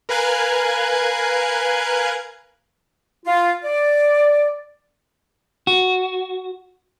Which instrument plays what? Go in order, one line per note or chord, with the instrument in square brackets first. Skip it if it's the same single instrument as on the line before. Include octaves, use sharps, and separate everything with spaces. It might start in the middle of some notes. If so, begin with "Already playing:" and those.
[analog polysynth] A#4 B4 F5 G#5 F#6 G#6
[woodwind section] F4
D5
[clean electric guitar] F#4